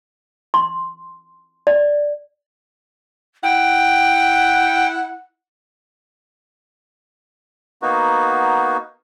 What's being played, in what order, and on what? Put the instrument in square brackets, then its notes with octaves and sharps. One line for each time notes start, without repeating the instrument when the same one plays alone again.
[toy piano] C6
D5
[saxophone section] E4 F#5 [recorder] G5
[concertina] A#3 B3 D#4 F#4